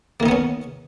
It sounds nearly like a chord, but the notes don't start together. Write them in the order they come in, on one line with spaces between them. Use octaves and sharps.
A#3 D#3 D#4 B3 C#4